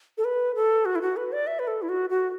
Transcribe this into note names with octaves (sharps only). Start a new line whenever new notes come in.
A4
B4
A4
F#4
E4
F#4
B4
D5
E5
B4
A4
E4
F#4
F#4